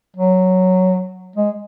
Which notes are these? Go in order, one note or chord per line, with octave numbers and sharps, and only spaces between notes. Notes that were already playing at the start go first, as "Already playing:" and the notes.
F#3
G#3